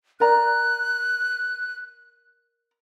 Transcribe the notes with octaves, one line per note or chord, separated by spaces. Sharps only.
A#4 D5 A#5 F#6